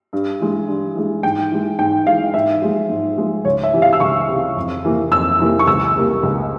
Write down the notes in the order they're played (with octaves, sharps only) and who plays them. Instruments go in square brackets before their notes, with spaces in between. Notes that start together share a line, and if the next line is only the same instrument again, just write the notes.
[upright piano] G2
E3 G#3
G2
E3 G#3
G#2 G5
E3 G#3
G#2 G5
E3 G#3 F5
G#2 E5
F3 G#3
G#2
F3 G#3
C#2 C#5
E5
C3 E3
F5
E6
C#2 C#6
C3 E3
F2
C3 E3 A#3
F2 E6
C3 E3 A#3
C#6
C#2 E6
C3 G3 A#3
C#2